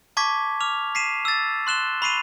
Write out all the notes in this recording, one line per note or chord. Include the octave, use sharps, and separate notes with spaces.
A5 C#6 D6 G#6 B6
D6 F6 F7
B6 C7 D#7 E7
E6 A6
C6 F#6 E7 G7
B5 C#6 C7 D#7 F7